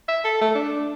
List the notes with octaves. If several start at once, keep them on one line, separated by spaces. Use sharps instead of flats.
E5
A4
A3
D4